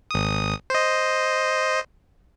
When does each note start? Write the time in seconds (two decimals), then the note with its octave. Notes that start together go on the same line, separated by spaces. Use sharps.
0.11 G#1 D#6
0.70 C5 D#5